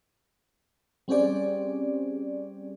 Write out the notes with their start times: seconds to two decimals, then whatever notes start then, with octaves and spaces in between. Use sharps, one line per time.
1.08 G3 C4 C#4 G4 G#4 D5